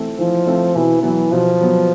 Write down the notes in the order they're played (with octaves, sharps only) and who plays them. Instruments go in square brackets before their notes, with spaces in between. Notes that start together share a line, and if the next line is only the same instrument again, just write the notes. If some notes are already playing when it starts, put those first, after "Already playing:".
Already playing: [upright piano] E3 A3 C4
[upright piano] E3 [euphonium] F3
[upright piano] A3 C4
[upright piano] B2 [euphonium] E3
[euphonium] E3 [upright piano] F#3 B3
[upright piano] B2 [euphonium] F3
[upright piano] F#3 B3